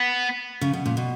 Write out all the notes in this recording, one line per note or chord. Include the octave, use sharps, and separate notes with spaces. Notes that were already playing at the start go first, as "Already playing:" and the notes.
Already playing: B3
C#3
B2
A#2
B2